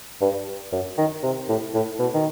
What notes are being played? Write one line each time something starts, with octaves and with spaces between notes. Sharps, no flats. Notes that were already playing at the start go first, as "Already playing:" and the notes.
G2
F#2
D#3
C3
A2
A2
B2
D#3